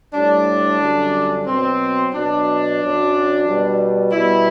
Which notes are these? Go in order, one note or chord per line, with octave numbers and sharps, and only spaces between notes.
A2 G3 D4
F#2 D3 G3
B2 F#3 C4
B2 F#3 D4
F#2 F#3
B2 G3
B2 G3 E4